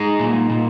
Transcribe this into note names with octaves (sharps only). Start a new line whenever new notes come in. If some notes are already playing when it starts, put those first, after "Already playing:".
Already playing: G#3 D#4
A#2
A#2